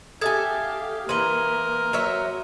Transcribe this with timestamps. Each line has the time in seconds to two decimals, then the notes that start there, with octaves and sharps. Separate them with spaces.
0.21 G4 A4 E5 F5 G#5 D#6 G#6
1.09 E3 A#3 A#4 B4 C6 D#7 G7
1.93 F#3 F#4 C#5 E5